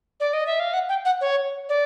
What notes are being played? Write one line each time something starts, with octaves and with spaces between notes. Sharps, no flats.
D5
D#5
E5
F5
F#5
G5
F#5
C#5
D5